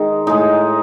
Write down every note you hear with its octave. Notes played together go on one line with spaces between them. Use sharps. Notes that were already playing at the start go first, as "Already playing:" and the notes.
Already playing: D#3 G#3 D#4
A2 G#3 D#4